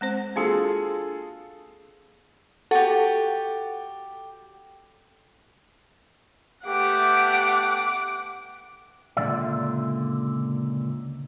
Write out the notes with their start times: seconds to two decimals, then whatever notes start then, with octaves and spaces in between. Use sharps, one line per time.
0.01 G#3 C4 C5
0.36 A#3 D4 F4 F#4 G#4 A4
2.71 F#4 G4 A4
6.65 A3 B3 G4 F#5 D6
9.17 C#2 A#2 D3 E3 D5 E5